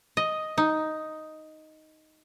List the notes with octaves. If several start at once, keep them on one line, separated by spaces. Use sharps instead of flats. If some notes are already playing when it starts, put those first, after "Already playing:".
D#5
D#4